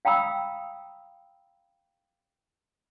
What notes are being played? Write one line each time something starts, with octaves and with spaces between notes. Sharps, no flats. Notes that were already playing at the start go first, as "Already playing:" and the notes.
F5 G5 A#5 B5 D#6 E6